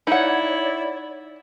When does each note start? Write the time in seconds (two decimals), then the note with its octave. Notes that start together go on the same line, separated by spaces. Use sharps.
0.07 D#4 E4 C#5 D5 F#5